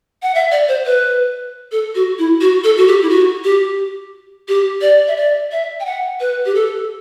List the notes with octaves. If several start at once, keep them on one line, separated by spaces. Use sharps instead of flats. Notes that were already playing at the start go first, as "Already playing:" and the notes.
F#5
E5
D5
C5
B4
A4
F#4
E4
F#4
A4
F#4
G4
E4
F#4
G4
G4
D5
E5
D5
E5
G5
F#5
B4
G4
A4